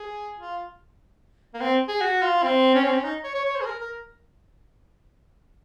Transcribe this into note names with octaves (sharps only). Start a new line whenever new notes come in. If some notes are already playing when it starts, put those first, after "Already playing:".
Already playing: G#4
F4
A#3
C4
G#4
F#4
F4
C4
C#4
C4
C#4
D#4
C#5
C#5
C#5
C5
G#4
A#4
A#4